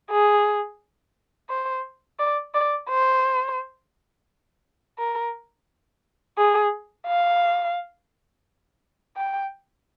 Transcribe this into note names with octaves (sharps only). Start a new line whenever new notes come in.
G#4
C5
D5
D5
C5
A#4
G#4
F5
G5